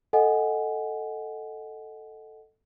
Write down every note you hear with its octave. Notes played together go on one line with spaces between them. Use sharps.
A4 D#5 F#5 G#5